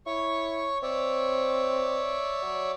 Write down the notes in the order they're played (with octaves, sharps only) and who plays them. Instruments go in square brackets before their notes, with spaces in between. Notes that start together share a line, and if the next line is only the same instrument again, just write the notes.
[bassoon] E4 [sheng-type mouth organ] C#5 C#6
[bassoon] C4 [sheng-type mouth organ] C#5 D5 E5
[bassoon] F#3